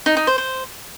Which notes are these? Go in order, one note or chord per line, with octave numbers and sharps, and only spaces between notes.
D#4
D#4
C5
C5